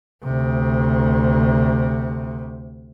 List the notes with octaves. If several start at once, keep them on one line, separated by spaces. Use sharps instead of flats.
D2 C3